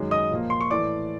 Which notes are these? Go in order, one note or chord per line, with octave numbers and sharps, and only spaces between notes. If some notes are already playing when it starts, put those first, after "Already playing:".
Already playing: F#2 D#3 G#3
D#5 D#6
A#2 F3 A#3
C6
C#6
A2 E3 A3 D5 D6